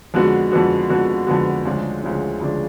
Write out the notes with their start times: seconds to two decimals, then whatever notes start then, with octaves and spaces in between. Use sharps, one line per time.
0.14 F2 D3 G#3 B3 F#4
0.52 F2 D3 G#3 B3 F#4
0.90 F2 D3 G#3 B3 F#4
1.27 F2 D3 G#3 B3 F#4
1.65 D2 C#3 F3 G#3 D4
2.02 D2 C#3 F3 G#3 D4
2.40 D2 C#3 F3 G#3 D4